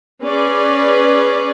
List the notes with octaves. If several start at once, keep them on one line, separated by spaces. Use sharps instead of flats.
C#4 G#4 B4 D5